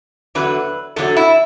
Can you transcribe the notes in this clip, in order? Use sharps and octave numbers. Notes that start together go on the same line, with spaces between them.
E2 D3 F#3 B4
E2 D3 F#3 A4
E4